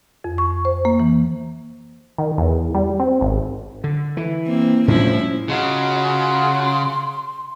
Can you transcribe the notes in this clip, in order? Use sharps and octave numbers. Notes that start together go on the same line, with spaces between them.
F2
C#6
C5
A#3
E3
D#3
E2
G3
C4
G#1
D3
E3
A#3 C4
A2 F3 G3 C#4 D4 E4
C#3 F#3 F4 F#4 D#5
C6